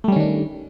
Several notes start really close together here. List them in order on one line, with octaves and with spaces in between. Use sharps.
A3 G3 C#4 D#3 D4